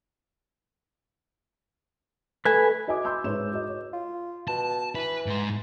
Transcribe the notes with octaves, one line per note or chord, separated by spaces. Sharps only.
A3 B4 G#5
F#4 D#5 E5 G#5 D6
B5 C6 D6 E6 G6
G#2 B4 C#5 E5 E7
F#4 D#5
C#5
F4
B2 A5
E3 B4
G#2 C6